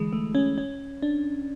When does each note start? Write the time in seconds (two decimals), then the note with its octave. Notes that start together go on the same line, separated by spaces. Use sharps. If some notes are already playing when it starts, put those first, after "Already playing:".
Already playing: D3 E3 G#3
0.13 A3
0.35 C#4
0.58 C#4
1.02 D4